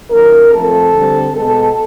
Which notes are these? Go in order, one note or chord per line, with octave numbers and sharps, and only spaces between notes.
D#3 F#3 A#3 C#4 A#4
F3 A3 C4 A4
D3 G3 C4
B2 G#3 B3 A4